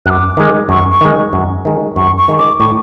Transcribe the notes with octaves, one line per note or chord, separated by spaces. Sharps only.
F#2 D6 F#6
D#3 G#3
F#2 C#6
C#6
D#3 G#3
F#2
D#3 G#3
F#2 C#6
C#6
D#3 G#3
D6
A2 C#6